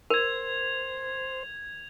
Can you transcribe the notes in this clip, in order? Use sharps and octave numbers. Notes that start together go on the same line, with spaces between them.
A#4 C5 G#6 F7